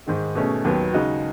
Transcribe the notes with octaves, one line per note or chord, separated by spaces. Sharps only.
G#2 D#3 G#3
B2 A3 C#4 G#4
D#2 D#3 F#3 B3
C#3 G#3 D#4 F#4